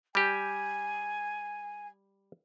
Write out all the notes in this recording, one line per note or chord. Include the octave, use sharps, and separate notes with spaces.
G3 G4 G#5